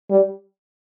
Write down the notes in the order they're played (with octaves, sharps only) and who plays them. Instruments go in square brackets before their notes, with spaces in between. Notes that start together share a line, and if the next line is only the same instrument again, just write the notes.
[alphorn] G3